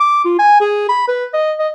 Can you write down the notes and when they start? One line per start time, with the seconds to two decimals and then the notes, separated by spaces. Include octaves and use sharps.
0.01 D6
0.25 F4
0.39 G#5
0.61 G#4
0.89 B5
1.08 B4
1.34 D#5
1.59 D#5